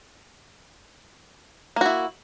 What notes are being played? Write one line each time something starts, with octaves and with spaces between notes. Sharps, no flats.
A#3 E4 F#4